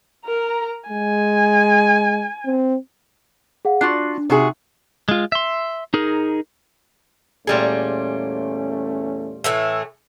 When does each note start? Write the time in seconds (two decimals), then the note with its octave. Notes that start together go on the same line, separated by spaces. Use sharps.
0.25 A#4 A#5
0.89 G#3 G#5
2.46 C4
3.65 G#4 F5 F#5
3.81 D4 F4 F#4 F#6 C7
4.18 D4
4.30 C3 D#4 F#4 G#4 E5
5.09 G#3 F4
5.32 E5 C6
5.94 D#4 G#4 A#4
7.47 E2 A#2 G3 A3 C#4 G#4
9.44 A2 E3 A3